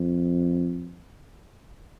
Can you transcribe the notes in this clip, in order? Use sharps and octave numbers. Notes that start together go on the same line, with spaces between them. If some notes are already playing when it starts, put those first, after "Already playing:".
Already playing: F2